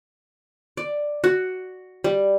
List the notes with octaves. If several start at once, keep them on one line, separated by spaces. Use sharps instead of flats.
D5
F#4
G3